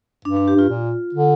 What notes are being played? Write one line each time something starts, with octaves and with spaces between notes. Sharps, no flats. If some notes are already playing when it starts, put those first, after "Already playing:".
G2 D4
D4
G4
G2 F4
A#2
D3